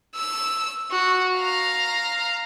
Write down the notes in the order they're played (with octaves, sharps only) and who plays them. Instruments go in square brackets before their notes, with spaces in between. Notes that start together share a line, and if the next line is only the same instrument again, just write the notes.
[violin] E6
F#4
F5 A#5